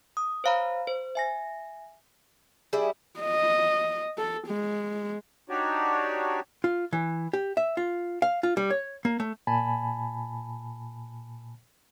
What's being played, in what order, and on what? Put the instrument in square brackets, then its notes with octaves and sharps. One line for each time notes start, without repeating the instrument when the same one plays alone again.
[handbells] D#6
C5 C#5 F5 A#5 B5
C5
E5 G#5 A#6
[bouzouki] G3 E4 [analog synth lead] G#4
[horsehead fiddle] D#5
A4
G#3
[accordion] D4 D#4 F#4 G4 C#5 D5
[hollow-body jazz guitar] F4
E3
G4
E5
F4
F5
F4
G3
C#5
A#3
A3
[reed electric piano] A#2 G#5 A5 B5